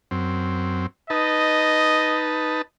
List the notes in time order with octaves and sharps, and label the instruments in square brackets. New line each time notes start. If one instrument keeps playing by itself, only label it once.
[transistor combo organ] F#2 C4
[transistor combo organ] D#4 B4 A5 [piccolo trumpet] D#5